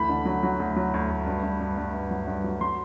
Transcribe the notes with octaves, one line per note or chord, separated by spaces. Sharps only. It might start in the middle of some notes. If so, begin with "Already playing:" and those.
Already playing: D2 E3 B5
D3
F#3
F#3
D2
F#3
D2
D2
G2
G2
G2
G2
G2
F#3
G2
F#3
F#3 C6